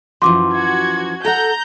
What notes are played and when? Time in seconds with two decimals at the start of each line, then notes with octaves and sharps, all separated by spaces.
0.22 F#2 E3 F3 C6 D6
0.54 F#4 G#6
1.25 A4 F#5 A#5 G6